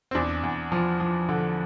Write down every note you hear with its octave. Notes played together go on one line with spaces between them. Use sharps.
C4
E2 D4
E2
F3
F3
D3